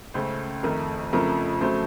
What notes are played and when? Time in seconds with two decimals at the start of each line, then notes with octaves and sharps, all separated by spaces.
0.14 C#2 C#3 A3 C5
0.63 F2 D#3 A3 A#4
1.13 F2 C#3 F3 A3 A#4
1.61 F2 C#3 F#3 A3 C5